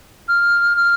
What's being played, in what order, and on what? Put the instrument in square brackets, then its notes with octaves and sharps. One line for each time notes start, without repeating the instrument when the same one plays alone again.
[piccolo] F6
F6